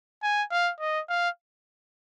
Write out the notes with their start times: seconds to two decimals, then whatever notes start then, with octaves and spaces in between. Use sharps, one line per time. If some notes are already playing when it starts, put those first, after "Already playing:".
0.22 G#5
0.51 F5
0.80 D#5
1.09 F5